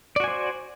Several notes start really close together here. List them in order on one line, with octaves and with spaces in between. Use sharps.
D5 F#4 G#5 C5